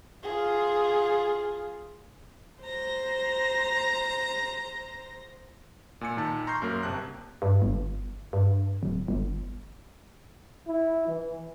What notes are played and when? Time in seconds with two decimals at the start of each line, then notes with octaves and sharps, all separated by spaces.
0.23 F4 G#4
2.62 C5 A#5
6.01 A#2 G#5 C#7
6.17 A#2 D#3 A5
6.47 A#5 C6 C#6 F6 G6 C7
6.62 F#2 A#3 A#4
6.83 G1 C3 A5 F#6
7.42 G2
7.62 G1
8.33 G2
8.83 D1
9.08 G1
10.68 E4
11.07 E3